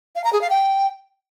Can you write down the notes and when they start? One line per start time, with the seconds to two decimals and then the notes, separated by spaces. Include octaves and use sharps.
0.16 F5
0.24 A#5
0.33 G#4
0.41 F5
0.50 G5